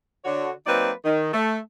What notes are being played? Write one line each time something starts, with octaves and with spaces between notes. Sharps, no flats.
D3 F#4 C#5
F#3 A#3 C4 D#4 B4 D5
D#3
A3